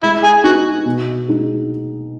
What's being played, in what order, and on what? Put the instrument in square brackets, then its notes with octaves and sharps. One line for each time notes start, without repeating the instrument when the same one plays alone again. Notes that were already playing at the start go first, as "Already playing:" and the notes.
[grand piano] G#3 [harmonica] E4
[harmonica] G#4
[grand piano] B3 D#4 [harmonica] F#4
[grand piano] B2
G#3 D#4 G#4